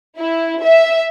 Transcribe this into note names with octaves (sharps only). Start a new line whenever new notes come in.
E4
E5